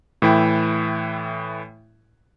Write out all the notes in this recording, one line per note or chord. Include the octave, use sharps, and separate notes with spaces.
A2 E3 E4 G5